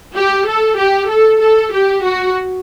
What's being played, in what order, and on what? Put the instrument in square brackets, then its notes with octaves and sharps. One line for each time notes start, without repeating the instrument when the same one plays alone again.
[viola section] G4
A4
G4
A4
A4
G4
F#4